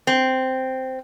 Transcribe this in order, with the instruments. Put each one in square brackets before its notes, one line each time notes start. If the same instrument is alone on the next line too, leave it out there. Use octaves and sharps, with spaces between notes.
[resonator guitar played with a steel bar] C4